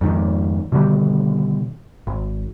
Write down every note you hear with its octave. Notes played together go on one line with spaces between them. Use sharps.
F2 G#2 D#3
B2 D3 D#3 G3
G#1